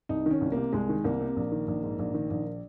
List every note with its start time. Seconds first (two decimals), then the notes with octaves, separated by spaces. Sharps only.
0.09 C2 D#4
0.26 D#3 C#4
0.41 C2
0.52 C3 A#3
0.73 C2 G#3
0.89 D#3
1.04 C2 A#3
1.21 C3
1.36 A#1
1.52 D#3
1.68 A#1
1.83 G#2
1.99 A#1
2.14 D#3
2.30 A#1